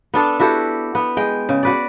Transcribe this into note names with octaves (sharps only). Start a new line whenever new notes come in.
B3 D4 A4
E4 F#4 G4 A4
B3
G#3 G5
C#3
F#4 B4 D5